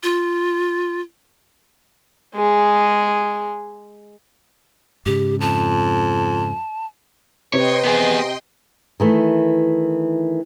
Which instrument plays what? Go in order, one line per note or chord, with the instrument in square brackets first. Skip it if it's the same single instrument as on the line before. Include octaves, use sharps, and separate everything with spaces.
[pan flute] F4
[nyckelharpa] G#3 G#4
[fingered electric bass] G#2 C#3 [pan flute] G4
[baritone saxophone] F2 [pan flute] A5
[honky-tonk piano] C3 [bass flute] B4 [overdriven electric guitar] C#5 [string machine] D#5 G5 C6
[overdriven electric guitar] B3 G#4
[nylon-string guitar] D#3 E3 A3